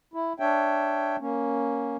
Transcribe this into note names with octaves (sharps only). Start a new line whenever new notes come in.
E4
D4 C#5 E5 G5
A#3 C#4